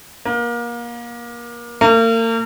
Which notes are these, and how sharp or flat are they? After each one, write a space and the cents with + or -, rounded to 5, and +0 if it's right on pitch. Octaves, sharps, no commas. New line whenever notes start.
A#3 +30
A#3 -40